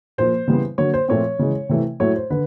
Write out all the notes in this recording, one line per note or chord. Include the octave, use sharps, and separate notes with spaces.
A#2 F3 A#3 C5
C#3 E3 G3 B3
D3 F#3 A#3 C#5
C5
A#2 F3 A3 C4 C#5
C#3 E3 G#3
C3 E3 A3
A2 F#3 A3 C#5
C5
D3 B4